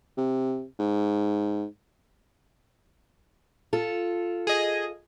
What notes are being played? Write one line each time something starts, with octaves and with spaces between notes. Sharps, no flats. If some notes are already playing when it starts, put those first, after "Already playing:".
C3
G#2
F4 A4
G#4 D#5